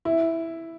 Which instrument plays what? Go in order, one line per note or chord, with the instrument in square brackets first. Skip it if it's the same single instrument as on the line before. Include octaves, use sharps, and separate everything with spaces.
[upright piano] E4